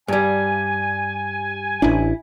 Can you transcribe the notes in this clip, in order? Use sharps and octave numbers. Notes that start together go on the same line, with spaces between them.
G2 G3 G#5
A1 D4 E4